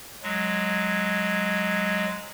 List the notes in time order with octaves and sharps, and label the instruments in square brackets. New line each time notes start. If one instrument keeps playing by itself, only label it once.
[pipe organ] F#3 G#3